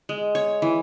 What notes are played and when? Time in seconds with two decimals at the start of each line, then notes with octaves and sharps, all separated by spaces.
0.09 G#3
0.35 C#5
0.62 E3